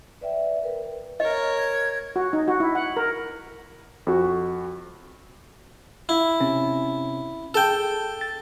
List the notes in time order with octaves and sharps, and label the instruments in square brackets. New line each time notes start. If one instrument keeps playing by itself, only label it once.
[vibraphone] B4 D5 E5 G5
A#4 B4
[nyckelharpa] A#4 C#5 [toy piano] D#5
[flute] G#6
[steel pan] F#4
D#4
F#4
E4
F#5
A#4
[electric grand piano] F2 F#4
[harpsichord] E4
[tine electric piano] C3 C4 C#4
[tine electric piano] G#4 [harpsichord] A4 G5
[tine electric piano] A6